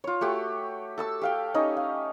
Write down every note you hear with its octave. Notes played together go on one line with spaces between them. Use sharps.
F4 C#5
A3 F#4 G4
A4 A5 E6
G4 F5 G5
C#4 D#4 D#5
F5